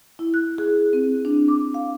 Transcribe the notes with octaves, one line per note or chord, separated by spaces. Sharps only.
E4
F#6
G#4
C4
D4
D6
F5